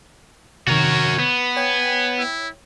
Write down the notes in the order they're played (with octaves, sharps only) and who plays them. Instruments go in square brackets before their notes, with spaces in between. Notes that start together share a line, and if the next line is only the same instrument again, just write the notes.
[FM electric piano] C3 D#3 [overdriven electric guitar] F#4 A#4 [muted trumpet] C#5
[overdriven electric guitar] B3
[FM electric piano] C#5 G5 [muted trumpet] G#5
[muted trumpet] E4